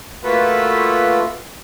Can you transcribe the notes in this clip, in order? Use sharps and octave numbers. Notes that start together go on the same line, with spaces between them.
A3 A#3 F4 F#4 A4 B4